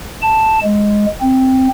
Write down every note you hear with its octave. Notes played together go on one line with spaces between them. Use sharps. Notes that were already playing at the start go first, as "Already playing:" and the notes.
A5
G#3
C4